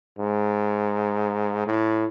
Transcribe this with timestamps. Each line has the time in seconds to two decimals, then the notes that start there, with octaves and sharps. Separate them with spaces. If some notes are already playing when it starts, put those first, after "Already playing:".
0.19 G#2
1.66 A2